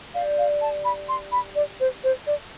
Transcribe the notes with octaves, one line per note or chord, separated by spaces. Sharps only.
G3 F5
F5
A5
B5
C6
B5
D5
C5
A3 C5
D5